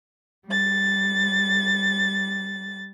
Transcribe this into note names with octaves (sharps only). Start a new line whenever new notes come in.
G3 A6